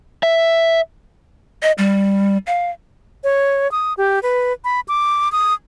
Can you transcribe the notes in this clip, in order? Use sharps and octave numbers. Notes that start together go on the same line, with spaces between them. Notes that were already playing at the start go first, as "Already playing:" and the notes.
E5
D#5
G3
F5
C#5
D#6
G4
B4
B5
D6
D#6